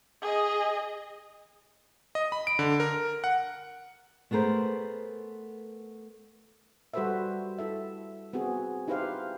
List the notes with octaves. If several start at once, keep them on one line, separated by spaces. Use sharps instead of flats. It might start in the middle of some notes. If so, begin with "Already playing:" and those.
G#4 D#5
D#5
B5
D7
D3
A#4
F#5
A3 B3 G#4 A#4 C5
G3 F#4 A4 B4 C5 E5
E4 A4 E5
B3 C4 F#4 G#4
D#4 E4 G4 B4 C5 F5